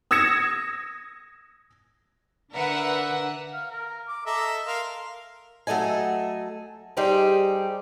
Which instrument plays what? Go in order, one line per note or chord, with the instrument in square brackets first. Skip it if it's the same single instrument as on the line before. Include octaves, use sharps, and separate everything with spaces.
[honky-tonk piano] D#6 E6 G#6 A#6 C#7 E7
[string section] D3 A#4 B4 E5 F#5
[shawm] F5
A#4
D6
[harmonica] A4 D#5 E5 [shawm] A#5
[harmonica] A#4 F5 [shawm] C6
[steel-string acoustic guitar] F#3 A3 A4 D#5 G#5
G3 D#4 G4 G#4 C5